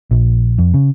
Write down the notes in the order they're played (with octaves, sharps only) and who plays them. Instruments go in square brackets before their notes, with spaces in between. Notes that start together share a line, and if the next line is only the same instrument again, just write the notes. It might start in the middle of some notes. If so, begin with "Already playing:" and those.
[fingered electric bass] A#1
F2
C#3